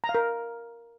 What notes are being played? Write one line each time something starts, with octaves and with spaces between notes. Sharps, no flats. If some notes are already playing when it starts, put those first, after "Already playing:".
A#5
F5
A#4